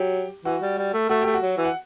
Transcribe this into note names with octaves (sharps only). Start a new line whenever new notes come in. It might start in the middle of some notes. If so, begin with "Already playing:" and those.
Already playing: F#3 G4
E3 F#4
G3
G3
A3
A3 F#4
A3 G4
F#4
F#3
E3
F#5